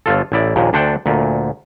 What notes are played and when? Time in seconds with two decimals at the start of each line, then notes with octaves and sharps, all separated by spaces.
0.06 G1 F4 A4
0.32 A1 E4 D5
0.56 A#1 D#2 A#2
0.73 D2 D4 C5 F#5 G5 A5
1.06 D2 A#2